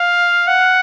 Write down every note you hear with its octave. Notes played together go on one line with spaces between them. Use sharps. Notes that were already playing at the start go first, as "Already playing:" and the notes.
Already playing: F5
F#5